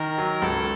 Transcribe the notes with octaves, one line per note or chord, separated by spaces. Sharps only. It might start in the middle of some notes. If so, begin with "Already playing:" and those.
Already playing: D#3 A#4
F#3
C#2 A4